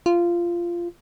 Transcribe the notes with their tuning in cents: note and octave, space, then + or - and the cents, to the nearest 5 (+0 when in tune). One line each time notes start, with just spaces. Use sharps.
F4 -15